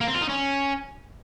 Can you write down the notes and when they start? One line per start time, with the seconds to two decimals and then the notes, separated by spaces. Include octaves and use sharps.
0.01 A#3
0.08 C4
0.15 F4
0.22 D#4
0.29 C#4